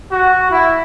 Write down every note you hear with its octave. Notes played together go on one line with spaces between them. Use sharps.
F#4
E4